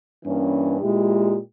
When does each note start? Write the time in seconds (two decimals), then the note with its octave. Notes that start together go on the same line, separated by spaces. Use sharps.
0.24 G2 E3 A#3 C#4
0.80 A#2 G#3 E4 G4